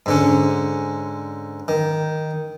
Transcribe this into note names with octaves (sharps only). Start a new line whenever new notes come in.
G#2 D3 C#4
D#3